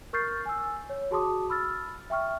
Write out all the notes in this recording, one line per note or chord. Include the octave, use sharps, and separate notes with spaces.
A#4 C#6 F6 G6 A6 C7
G#5 E6
C#5
F#4 G#4 A5 C6 D6 D#6
B5 E6 F6 A6
E5 G5 C#6 F6